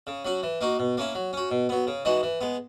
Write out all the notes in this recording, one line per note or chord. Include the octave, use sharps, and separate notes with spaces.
C#3
F#3 C#4 F#4
E3
A#3 D#4 F#4
B2
A#3 C#4 E4
F#3
C#4 F#4
B2
F#3 B3
C#3
E3 G#3 D#4 F#4
E3
G#3 B3